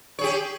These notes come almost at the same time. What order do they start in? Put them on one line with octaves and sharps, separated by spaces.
C#5 G#4 G4